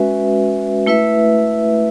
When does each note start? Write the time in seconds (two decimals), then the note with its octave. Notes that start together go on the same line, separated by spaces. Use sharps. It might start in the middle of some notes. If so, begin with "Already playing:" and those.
Already playing: G#3 C#4 F#4 B4 E5
0.86 A3 E4 B4 E5